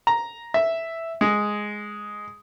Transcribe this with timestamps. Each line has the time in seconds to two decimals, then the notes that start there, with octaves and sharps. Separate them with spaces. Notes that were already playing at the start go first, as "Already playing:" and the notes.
0.07 A#5
0.54 E5
1.21 G#3